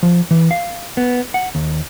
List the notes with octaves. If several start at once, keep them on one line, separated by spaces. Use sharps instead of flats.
F3
E3
F5
B3
F#5
D#2